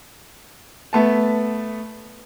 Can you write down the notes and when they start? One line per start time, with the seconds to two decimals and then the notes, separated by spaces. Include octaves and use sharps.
0.93 A3 B3 A5